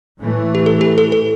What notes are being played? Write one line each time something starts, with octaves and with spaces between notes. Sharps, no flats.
A2 E3 A3
G4
A4
G4
A4
A4